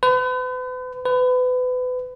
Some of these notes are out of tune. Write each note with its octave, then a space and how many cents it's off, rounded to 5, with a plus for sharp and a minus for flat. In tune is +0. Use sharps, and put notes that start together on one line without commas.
B4 +40
B4 +30